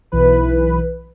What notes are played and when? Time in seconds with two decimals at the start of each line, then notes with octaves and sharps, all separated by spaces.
0.12 B1 E3 B4